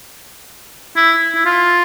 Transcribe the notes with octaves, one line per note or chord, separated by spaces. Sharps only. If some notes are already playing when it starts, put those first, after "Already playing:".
E4
E4
F4